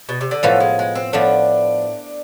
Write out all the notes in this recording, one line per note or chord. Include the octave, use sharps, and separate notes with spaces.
B2
C3
D3
A2 E3 F3 B3 F4 A4
G#3
G#3
C4
A2 F3 B3 D4 E4